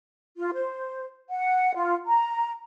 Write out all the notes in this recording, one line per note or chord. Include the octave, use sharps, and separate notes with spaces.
F4
C5
F#5
F4
A#5